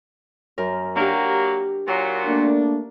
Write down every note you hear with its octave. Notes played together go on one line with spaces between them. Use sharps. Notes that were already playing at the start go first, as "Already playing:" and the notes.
F#2 A#4
F#3 A#3 D4 G4
A#2 F#3 A#4
A3 A#3 D4